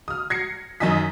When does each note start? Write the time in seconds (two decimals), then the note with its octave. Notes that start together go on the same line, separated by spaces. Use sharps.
0.08 D#6 F6
0.30 G#6 A#6 C7 C#7
0.80 F#2 D#3 D#5 G#5 D#6 B6